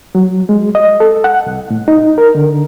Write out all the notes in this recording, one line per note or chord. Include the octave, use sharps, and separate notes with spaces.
F#3
G#3
D#5
A4
F#5
C2
A2
D#4
A#4
D3